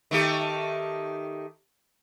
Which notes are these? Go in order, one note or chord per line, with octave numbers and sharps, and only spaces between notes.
D#3 A3 G4